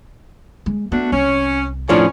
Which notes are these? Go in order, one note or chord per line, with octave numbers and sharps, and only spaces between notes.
G#3
A3 B3 D4 F#4
C2 C#4
F2 A2 F3 C#4 D4